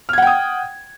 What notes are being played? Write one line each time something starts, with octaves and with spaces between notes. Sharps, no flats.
F#5 G5 D#6 F6 G#6